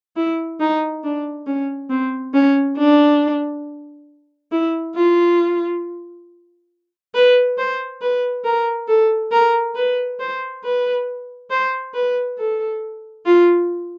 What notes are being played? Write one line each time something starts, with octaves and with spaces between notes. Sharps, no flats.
E4
D#4
D4
C#4
C4
C#4
D4
E4
F4
B4
C5
B4
A#4
A4
A#4
B4
C5
B4
C5
B4
A4
F4